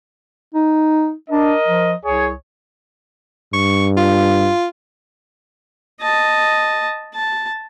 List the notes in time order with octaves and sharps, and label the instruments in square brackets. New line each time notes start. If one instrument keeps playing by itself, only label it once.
[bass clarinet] D#4
[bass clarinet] D4 [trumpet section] A#4 D#5
[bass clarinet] F3
[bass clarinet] C2 [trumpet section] G#4 C#5
[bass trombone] G2 [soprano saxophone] C#6
[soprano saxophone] F4
[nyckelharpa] D#5 A5
A5